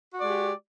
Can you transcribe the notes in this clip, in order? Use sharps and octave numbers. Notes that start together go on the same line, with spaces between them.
G#3 F#4 G4 D5